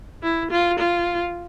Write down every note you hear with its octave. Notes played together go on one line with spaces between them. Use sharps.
E4
F4
F4